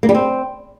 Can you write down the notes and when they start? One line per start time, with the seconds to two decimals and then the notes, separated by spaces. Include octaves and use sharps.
0.03 A#3
0.09 G3
0.15 C4